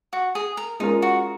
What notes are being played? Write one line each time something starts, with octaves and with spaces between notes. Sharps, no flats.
F#4
G#4
A#4
G#3 C#4 D#4 F4 A#4
F#4